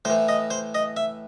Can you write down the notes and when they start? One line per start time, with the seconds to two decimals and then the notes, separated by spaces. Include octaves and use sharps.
0.05 A2 E3 C5
0.28 D#5
0.51 C5
0.75 D#5
0.97 E5